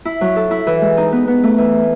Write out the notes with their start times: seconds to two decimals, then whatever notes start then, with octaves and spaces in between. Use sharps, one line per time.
0.05 E4
0.21 F#3
0.36 A4
0.51 E4
0.67 E3
0.81 G#3
0.97 D#4
1.12 B3
1.28 B3
1.43 A3
1.58 E3